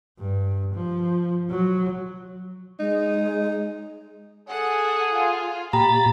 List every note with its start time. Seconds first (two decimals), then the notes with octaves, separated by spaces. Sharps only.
0.19 G2
0.74 F3
1.50 F#3
2.80 G#3 D#4
4.49 G#4 A4 F#5
5.14 F4
5.73 A#2 G4 A#5 B5 A6